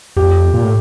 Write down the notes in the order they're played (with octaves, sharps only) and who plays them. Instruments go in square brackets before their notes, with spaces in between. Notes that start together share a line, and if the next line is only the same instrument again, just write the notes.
[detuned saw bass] F2 [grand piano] G4
[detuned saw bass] A#2
A2